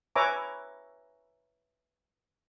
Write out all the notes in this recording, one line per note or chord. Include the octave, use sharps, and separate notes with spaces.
B4 C#5 E5 G#5 A#5 D6